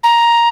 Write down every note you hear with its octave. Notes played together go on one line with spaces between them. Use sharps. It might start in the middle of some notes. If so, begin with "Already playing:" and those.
A#5